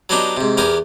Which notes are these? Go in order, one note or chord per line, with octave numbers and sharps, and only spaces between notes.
F#3 B3 D4 D#4 G4
G#2 C3
E2 B3 G4 A#4 G#5